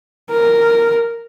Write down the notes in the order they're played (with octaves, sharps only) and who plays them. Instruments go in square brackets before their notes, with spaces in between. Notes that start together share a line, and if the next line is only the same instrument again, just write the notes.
[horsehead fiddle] A#4